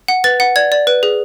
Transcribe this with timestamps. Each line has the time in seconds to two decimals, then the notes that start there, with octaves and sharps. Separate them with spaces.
0.08 F#5
0.24 B4 A6
0.40 F#5
0.56 D5 G#6
0.72 D5
0.87 B4
1.03 G#4